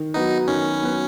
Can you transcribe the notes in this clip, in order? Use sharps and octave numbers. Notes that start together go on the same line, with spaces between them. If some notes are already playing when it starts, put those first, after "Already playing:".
Already playing: D#3
F#3 B3 D#4 F#4 B4
D#3 C#4
F#3 B3 F#4 B4